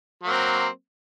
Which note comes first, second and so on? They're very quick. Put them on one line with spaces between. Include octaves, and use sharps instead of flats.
F#3 A#3 C4